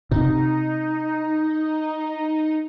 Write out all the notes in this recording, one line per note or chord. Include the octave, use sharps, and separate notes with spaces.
C3 D#4